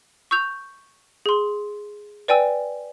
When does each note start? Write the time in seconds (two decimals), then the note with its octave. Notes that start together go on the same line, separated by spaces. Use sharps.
0.31 C#6 E6 G6 F7
1.26 G#4 C6
2.28 B4 D5 G5 G#5 E6